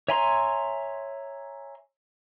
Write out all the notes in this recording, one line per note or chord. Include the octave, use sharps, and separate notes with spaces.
C#5 E5 G#5 A#5 C6